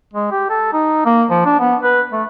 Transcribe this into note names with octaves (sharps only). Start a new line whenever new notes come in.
G#3
G4
A4
D#4
A#3
F3
D4
B3
B4
A3